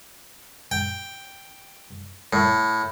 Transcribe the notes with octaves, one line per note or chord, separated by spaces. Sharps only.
G5
A2